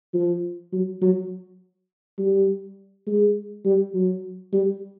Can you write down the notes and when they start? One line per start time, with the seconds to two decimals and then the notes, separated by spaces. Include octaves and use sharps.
0.14 F3
0.73 F#3
1.02 F#3
2.18 G3
3.07 G#3
3.65 G3
3.94 F#3
4.53 G3